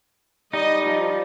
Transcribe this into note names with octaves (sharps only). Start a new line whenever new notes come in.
G3 D#4 D#5
F3